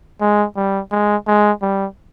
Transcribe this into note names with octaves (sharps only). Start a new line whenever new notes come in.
G#3
G3
G#3
G#3
G3